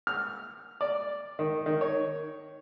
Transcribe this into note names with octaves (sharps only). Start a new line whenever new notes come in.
F6
D5
D#3
D#3
C#5